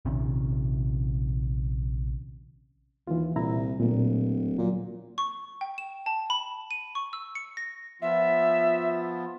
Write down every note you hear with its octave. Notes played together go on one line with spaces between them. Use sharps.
A#1 C3 D#3 C#4
D#2 E3 F4
C2 A#2 E4 A#5
D1 A#2
A#2 F#3
C#6
G5
E7
A5
B5
D#7
C#6
E6
C#7
A#6
F3 B3 F4 E5